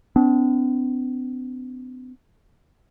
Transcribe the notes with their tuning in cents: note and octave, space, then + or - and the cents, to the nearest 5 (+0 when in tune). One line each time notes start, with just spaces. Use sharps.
B3 +45 D4 -30